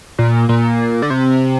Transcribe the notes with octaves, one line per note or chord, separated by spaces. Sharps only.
A#2
A#2
D3
C3